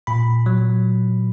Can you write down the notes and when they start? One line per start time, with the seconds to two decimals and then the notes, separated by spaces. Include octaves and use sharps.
0.07 A#2 B5
0.46 F#3